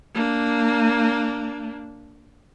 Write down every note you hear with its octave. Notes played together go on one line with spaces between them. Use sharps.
A#3 D4